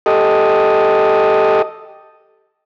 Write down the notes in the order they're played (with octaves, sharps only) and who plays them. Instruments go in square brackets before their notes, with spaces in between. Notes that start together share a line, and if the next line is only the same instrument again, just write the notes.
[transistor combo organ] G4 A4 D#5